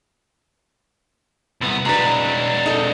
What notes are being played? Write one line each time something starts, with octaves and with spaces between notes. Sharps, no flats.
C2 B3
F#3 G#3 D4 B4
D#4 A4